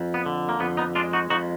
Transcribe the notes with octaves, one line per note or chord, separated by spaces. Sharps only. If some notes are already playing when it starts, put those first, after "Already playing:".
Already playing: F2
B3
D3
A#3
F2 B3
B3 D#4
G#3 D4 F4
D#4 F#4
F2 D#4 F#4